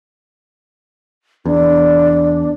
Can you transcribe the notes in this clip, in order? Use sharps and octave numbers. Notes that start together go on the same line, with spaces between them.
E2 D4